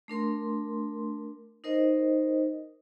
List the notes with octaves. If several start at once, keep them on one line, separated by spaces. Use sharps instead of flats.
A3 D4 A#4 C6
D#4 A#4 C5 D#5